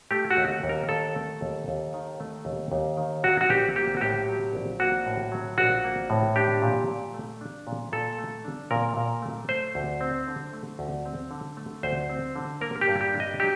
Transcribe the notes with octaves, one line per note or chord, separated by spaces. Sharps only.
A3 G4
F#4
D#2
D#2
A#4
D#3 A4
A3
D#2
D#2
D#3
A3
D#2
D#2
D#3
F#3 F#4
F#4
A#1 G4
A#3 G4
F#4
A2 G4
F#3
A#1
A#3 F#4
A2
F#3
A#1 F#4
A#3
A2
D4 G4
A#2
A#2
A3
D4
A#2
A#2 A4
A3
D4
A#2 A#4
A#2
A3
A3 C5
D2
C4
D3
A3
D2
C4
D3
A3
D2 C5
C4
D3
A#3 A#4
G4
G2
G4
D4
D#5
F#3 G4